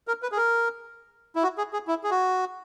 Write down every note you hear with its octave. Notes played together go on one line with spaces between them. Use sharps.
A#4
B4
G#4
A#4
E4
F#4
G#4
G#4
E4
G#4
F#4